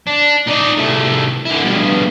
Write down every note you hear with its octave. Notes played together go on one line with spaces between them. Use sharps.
D4
D#4 D5
C2 A3
D3 E4
G2 B2